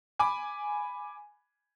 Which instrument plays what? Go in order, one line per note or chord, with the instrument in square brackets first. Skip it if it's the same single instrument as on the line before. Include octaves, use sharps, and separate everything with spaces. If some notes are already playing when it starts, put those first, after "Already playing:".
[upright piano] G#5 B5 D6